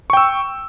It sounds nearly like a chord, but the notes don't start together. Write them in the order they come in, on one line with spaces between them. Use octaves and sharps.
C#6 G5 E6